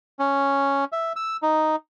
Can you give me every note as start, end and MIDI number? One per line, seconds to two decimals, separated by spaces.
0.19 0.85 61
0.92 1.13 76
1.16 1.37 88
1.42 1.76 63